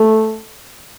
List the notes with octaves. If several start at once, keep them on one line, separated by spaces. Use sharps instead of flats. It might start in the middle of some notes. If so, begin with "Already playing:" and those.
Already playing: A3